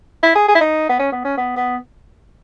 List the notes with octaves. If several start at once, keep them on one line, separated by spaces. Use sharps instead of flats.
E4
G#4
G#4
E4
D#4
B3
C#4
B3
C#4
B3
B3